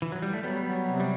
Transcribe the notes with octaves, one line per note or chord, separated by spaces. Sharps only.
E3
F#3
G3
A3
F#3 G3 B3
F#3
C3
G3